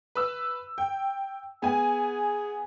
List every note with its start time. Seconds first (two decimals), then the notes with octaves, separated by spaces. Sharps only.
0.15 B4 E6
0.78 G5
1.62 B3 G#4 G#5